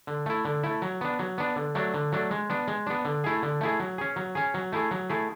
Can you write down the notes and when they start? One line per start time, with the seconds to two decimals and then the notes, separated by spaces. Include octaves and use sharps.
0.07 D3
0.26 A3 E4
0.45 D3
0.64 A3 E4
0.82 F#3
1.01 B3 D4
1.19 F#3
1.38 B3 D4
1.56 D3
1.75 F#3 A3 D4
1.94 D3
2.12 F#3 A3 D4
2.31 G#3
2.50 B3 D4
2.67 G#3
2.87 B3 D4
3.05 D3
3.24 A3 E4 G#4
3.43 D3
3.61 A3 E4 G#4
3.80 F#3
3.98 C#4 G#4
4.16 F#3
4.35 C#4 G#4
4.54 F#3
4.73 A3 E4 G#4
4.91 F#3
5.10 A3 E4 G#4